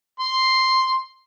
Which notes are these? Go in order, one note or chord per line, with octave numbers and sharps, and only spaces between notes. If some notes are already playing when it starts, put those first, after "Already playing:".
C6